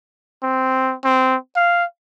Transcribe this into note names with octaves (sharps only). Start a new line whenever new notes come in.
C4
C4
F5